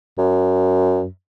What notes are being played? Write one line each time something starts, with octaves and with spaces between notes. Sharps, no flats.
F#2